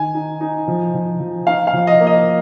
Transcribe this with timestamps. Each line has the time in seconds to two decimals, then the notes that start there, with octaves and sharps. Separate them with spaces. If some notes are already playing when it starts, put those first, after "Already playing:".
Already playing: D#3 G#5
0.14 D#4
0.41 D#4
0.68 F3
0.94 F3
1.20 F3
1.47 D#4 F5
1.67 F5
1.73 F3
1.87 D#5
2.00 A#3
2.07 D#5